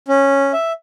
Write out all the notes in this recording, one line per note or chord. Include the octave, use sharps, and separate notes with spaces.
C#4
E5